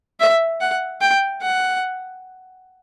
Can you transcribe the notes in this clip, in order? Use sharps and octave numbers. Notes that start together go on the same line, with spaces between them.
E5
F#5
G5
F#5